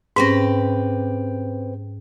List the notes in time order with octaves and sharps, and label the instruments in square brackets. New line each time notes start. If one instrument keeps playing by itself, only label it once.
[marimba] G#2 C#4 A#6 [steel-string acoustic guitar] C4 G4 B4